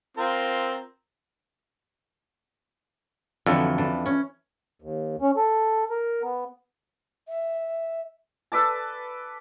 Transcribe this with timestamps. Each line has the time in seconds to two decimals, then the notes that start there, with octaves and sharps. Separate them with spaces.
0.17 C4 F4 A#4
3.46 F2 D3 E3 F#3
3.78 E3 D4
4.06 C#4
4.82 D#2
5.22 C#4
5.36 A4
5.90 A#4
6.23 B3
7.28 E5
8.52 A4 B4 D5 A5